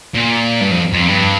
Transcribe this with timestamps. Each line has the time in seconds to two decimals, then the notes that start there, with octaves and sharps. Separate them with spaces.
0.14 A#2
0.61 G2
0.71 F2
0.93 F2
1.08 G2